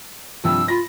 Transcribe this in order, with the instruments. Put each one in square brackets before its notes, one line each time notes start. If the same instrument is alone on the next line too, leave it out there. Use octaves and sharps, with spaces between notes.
[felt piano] G2 C3 F3 [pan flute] E6
[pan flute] F4 [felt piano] B5 A#6